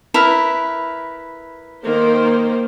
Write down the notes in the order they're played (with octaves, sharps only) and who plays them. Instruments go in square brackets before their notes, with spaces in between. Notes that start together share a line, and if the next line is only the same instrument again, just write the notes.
[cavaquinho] E4 A#4 B4
[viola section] D#3 A#3 C5